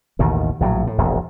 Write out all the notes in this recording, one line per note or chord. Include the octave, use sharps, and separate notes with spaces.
A1 D#2 B2 D#3
A#1 A2 C3 F#3
A2
E1 A#1 F2